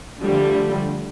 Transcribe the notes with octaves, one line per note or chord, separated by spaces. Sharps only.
D3 F3 G3 A3